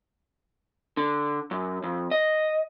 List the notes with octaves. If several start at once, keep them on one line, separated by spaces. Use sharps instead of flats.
D3
F#2
F2
D#5